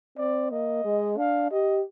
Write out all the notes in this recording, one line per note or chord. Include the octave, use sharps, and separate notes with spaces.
C4 D5
A#3 D#5
G#3
D4 F5
G4 D#5